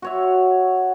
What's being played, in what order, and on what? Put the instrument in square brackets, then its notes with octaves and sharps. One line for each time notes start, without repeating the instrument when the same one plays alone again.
[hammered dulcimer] F#4 C#5 E5